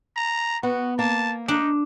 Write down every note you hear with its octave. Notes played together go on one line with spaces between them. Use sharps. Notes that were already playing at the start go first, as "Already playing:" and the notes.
A#5
B3 F#4
A#3 A5
D4 D#4